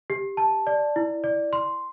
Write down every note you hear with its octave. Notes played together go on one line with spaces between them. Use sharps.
G4
A5
D5
E4
D5
C6